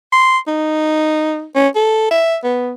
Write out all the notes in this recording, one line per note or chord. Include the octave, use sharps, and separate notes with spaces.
C6
D#4
C#4
A4
E5
B3